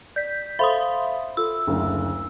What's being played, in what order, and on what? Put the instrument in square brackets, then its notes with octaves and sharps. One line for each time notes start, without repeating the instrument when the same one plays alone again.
[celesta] D5 [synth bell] G6 B6
[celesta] A4 C5 F5 [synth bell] E5 C6 D#6 [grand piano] B5
[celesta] F4 A4 [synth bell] E6
[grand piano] F#1 D2